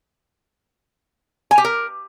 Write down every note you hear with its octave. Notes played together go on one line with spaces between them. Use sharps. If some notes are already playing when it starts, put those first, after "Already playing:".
G#5
G4
A#4